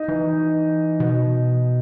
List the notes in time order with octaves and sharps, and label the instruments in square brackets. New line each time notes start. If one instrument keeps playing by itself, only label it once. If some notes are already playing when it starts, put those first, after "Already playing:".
Already playing: [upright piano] D#4
[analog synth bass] E3
B2